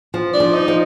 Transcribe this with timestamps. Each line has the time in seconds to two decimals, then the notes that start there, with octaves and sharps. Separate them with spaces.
0.14 F3
0.34 D4
0.40 F3
0.54 D#4
0.68 F3